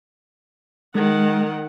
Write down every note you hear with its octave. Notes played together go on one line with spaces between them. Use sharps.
D#3 G#3 F#5